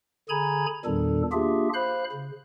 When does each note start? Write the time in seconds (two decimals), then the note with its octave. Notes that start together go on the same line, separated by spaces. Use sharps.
0.29 D3 G#4 G#5 A#5 B5 G#6
0.85 E2 A#2 D#3 G3 D4 A4
1.32 A#3 D4 F4 G4 G#4 E5
1.74 C5 F5 B5 F#6
2.12 C#3